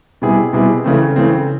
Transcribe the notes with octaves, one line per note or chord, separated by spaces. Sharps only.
B2 G3 C4 E4 G#4
B2 G3 C4 E4 G#4
C#3 E3 A3 C4
C#3 E3 A3 C4